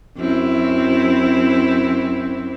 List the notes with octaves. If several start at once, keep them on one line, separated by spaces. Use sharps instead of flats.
F#2 C4 E4